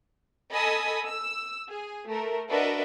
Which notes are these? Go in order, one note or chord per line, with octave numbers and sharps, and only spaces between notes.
A4 D#5 G#5 B5 D#6 E6
E6
G#4
A3 A#4
D4 F#4 A#4 B4 D#5 E5